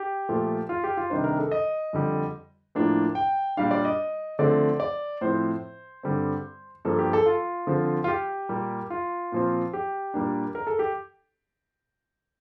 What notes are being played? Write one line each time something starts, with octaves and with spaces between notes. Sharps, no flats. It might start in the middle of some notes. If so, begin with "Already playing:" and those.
Already playing: G4
A#2 F3 A3
F4
G4
F4
C3 D#3 G3 D4 C5
A#4
A4
D#5
F2 D3 G3
A2 F3 A#3 D4
G5
A#2 G3 D4 F5
D5
D#5
D3 F3 A3 C4 D5
D5
A2 F3 C4 C5
G2 D3 G3 C4
G2 F3 A#3 A4
G4
A4
F4
D3 F3 C4
F4
G4
A#2 G3 A#3
F4
A#2 F3 C4
G4
A#2 G3 A#3 D4
A#4
A4
G4